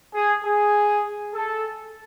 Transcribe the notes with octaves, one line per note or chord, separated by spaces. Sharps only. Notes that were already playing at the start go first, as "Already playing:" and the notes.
G#4
G#4
A4